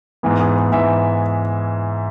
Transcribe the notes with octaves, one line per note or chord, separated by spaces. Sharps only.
G#2 E3 B3
G#4
B4
G#2 E3 E5